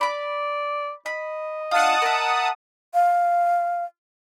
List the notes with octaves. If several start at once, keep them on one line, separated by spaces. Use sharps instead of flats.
D5 B5 D6
D#5 B5
D4 F4 F#5 A5 D#6
A#4 E5
F5